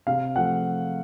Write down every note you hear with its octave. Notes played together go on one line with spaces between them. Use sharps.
C3 F5
F3 A3 F#5